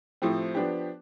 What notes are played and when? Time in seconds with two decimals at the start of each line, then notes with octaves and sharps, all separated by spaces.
0.22 A2 F3 C4 G4
0.55 F3 B3 D4 G4